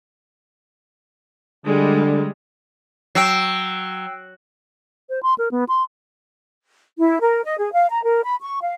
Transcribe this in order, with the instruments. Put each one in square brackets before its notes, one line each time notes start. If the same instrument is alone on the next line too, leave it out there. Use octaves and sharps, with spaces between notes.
[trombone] D3 [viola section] G3 G#3
[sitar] F#3 [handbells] G5 E6 C7
[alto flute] C5
C6
A#4
B3
C6
[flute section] E4
A#4
D#5
G#4
F5
A#5
A#4
B5
C#6
F5